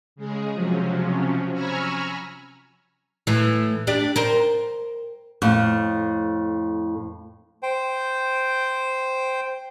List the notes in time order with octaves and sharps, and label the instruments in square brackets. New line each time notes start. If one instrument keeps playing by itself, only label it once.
[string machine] C#3 G#3 G#4
C3 F3 F#3 C#4
G#5 A#5 B5 C#6 E6 F6
[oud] A2 E3
D4 G4
A#4 C5
[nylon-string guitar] F2 A2
[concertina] C5 G5